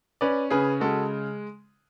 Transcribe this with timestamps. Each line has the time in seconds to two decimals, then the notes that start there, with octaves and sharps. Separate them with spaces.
0.21 C#4 B4 D5
0.50 C#3 G#4 B4
0.80 G#3 F#4 A4